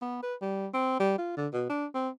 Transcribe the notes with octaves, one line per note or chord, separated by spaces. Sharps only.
B3
B4
G3
C4
G3
F4
D3
B2
D4
C4